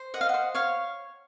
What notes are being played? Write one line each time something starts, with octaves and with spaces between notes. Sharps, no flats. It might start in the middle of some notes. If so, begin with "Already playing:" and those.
Already playing: C5
D#5 F#5
F5
C5 F#5
C#5 F5